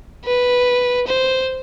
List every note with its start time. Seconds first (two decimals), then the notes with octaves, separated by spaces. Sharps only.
0.25 B4
1.07 C5